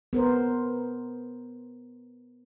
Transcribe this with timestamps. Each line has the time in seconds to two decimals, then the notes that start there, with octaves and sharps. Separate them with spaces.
0.13 B3 A#4 C5